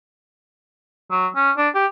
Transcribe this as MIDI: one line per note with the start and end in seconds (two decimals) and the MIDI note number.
1.11 1.27 54
1.36 1.51 61
1.57 1.69 62
1.75 1.86 67